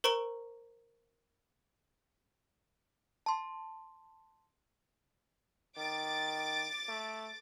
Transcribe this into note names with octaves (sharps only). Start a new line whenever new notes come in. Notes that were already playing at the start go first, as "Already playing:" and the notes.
A#4 C5 A#5 C#6 D7 G7
A5 C6
D#3 D6 A6
A3